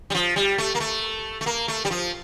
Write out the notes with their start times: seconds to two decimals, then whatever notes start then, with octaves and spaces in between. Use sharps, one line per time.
0.10 G3
0.15 F3
0.36 G3
0.58 A3
0.75 A#3
0.80 A3
1.41 A3
1.46 A#3
1.68 A3
1.85 G3
1.91 F3